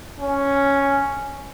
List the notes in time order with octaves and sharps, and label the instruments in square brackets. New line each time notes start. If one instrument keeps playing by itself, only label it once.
[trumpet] C#4